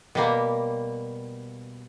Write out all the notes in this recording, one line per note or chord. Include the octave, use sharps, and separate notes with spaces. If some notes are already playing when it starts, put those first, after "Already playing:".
B2 G3 A#3